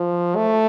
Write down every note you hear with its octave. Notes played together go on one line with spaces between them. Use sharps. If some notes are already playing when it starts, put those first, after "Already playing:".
Already playing: F3
A3